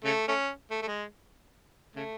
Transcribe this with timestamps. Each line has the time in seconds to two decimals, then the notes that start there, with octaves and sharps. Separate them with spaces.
0.04 C#3 A3
0.28 A3 C#4
0.70 A3
0.82 A3
0.87 G#3
1.96 C#3 A3